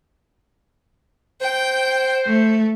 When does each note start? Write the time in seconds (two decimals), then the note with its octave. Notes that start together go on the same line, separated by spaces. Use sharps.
1.41 C5 G5
2.27 A3